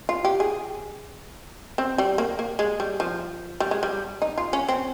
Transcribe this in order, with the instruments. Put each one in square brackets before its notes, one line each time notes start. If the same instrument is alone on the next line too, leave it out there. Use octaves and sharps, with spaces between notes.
[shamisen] F4
G4
G#4
C4
G3
A#3
A#3
G#3
G3
F3
G3
G#3
G3
D#4
F4
C#4
C4